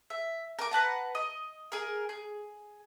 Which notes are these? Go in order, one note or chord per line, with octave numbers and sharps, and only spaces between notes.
E5
A#4 D6
B4 F#5 A5 A#5
D#5
G#4 A#4
G#4